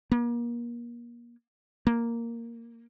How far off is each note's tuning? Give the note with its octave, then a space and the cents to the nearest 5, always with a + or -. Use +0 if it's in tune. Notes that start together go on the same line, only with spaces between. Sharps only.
A#3 +30
A#3 -5